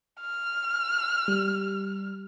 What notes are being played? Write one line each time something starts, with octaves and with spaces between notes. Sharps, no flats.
F6
G3